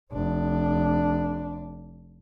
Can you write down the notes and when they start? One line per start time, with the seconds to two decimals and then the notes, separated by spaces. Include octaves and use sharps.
0.12 F1 D4